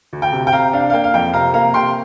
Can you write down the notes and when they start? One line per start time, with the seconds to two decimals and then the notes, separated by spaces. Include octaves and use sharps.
0.13 D2
0.22 G5
0.32 C3
0.47 G5
0.53 C3 F5 A#5
0.73 D4 F5
0.90 F5
0.93 A#3 G5
1.04 F5
1.14 F2 G5
1.33 C3 F5 A#5
1.54 A#3 F5 A#5
1.74 C3 G5 C6